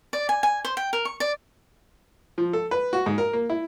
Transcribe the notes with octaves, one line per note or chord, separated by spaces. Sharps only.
D5
G#5
G#5
C5
G5
A#4
C#6
D5
F3
A4
B4
F#4
G#2
A#4
A#3
E4